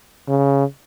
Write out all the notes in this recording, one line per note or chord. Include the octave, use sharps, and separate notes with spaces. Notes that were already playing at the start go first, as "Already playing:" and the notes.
C#3